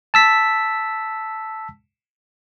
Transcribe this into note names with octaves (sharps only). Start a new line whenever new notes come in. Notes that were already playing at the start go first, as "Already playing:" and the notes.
A5 E6 B6